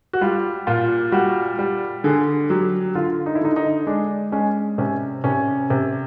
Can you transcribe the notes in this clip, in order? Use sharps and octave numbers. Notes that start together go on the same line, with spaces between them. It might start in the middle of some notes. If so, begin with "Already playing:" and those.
F#4
G3 F4
A#2 F4
G3 F#4
G3
D3 G#4
F#3 G4
D3 F4
D#4
E4
D3 D#4
D#4
G#3 D4
G#3 C#4
C3 C#4
C3 C#4
C3